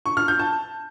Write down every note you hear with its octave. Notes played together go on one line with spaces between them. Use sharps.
C#6
F6
G6
A5